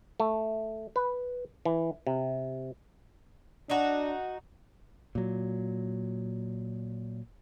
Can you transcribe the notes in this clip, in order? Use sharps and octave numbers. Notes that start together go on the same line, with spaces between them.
A3
B4
E3
C3
D4 D#4 F#4
A#2 F#3